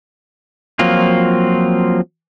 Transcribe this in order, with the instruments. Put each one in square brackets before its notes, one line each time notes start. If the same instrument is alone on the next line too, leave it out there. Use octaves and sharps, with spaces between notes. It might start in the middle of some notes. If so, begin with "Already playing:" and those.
[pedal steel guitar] F3 F#3 A#3 C4 F4